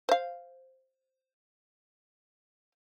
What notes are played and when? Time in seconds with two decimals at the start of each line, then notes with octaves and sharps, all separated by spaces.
0.09 C5 F5